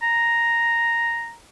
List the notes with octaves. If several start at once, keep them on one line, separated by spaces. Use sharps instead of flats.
A#5